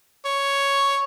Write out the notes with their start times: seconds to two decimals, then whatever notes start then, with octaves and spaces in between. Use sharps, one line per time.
0.25 C#5